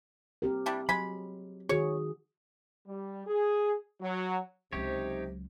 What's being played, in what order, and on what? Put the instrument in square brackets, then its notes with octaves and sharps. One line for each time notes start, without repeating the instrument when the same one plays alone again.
[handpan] C4 G4 A#4
[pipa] G3 D4 E4
[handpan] F#3 [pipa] G#3 B5
[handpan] D#3 F#4 G#4 [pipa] C#5
[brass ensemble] G3
G#4
F#3
[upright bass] C#2 F#3 [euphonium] C3 [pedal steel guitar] D#4 G4 C#5 [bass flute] C5